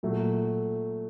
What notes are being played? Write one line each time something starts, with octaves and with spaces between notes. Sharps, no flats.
A#2 F#3 A3